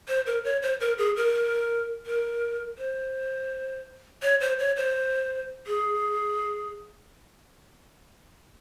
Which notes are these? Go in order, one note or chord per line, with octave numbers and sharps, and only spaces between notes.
C5
A#4
C#5
C5
A#4
G#4
A#4
A#4
C5
C#5
C5
C#5
C5
G#4